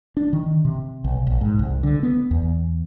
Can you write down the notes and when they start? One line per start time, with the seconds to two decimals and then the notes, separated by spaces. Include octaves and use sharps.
0.17 D4
0.33 D#3
0.65 C3
1.04 B1
1.27 A#1
1.41 G#2
1.59 C2
1.83 D3
2.03 B3
2.31 E2